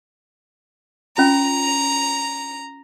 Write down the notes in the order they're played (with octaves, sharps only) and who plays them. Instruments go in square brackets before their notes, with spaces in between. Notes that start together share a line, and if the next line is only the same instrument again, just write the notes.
[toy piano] C#4 F4 [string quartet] A#5